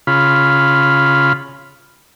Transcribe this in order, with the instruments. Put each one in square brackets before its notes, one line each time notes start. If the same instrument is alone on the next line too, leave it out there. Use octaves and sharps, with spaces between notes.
[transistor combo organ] C#3 F4 B5